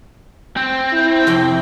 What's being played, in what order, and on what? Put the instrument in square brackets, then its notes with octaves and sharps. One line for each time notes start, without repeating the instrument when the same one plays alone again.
[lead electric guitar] C4
[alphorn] E4
[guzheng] F2 C3 G5